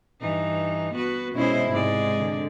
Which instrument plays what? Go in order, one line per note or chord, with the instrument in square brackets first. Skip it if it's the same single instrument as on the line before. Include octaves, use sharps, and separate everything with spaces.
[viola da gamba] G2 E3 D#4
B3 F#4 B4
[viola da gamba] B2 G#3 C5 [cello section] C#4 E4
[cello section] G#2 [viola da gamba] C3 G#3 D5
[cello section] D3